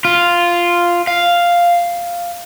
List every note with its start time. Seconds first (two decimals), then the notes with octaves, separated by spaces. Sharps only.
0.05 F4
1.07 F5